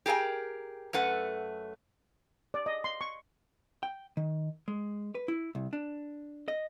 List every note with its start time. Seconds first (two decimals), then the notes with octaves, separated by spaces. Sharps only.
0.06 G4 G#4 A#4 D#5 G5
0.93 F#2 A3 B4 F#5
2.54 D5
2.66 D#5
2.84 C6
3.01 C#6
3.83 G5
4.17 D#3
4.68 G#3
5.15 B4
5.28 E4
5.55 C2
5.73 D4
6.48 D#5